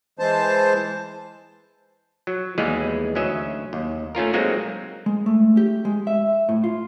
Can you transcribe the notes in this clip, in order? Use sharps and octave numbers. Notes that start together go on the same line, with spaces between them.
E3 G#3 C5 A5
F#3
D#2 E3 G3 G#3 B3 G#4
D2 F#3 C#4 D#5 E5
D#2
A3 C#4 F4 A#4
F#3 G#3 A#3 C4 D#4 F#4
G#3
A3
G4
G#3
E5
A2
F4